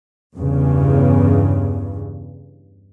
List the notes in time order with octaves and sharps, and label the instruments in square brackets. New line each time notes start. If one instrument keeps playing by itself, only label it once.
[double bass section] E2 G2 C#3